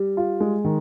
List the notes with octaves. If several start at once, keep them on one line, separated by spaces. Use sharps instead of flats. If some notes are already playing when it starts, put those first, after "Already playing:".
Already playing: G3
F4
G#3
D#3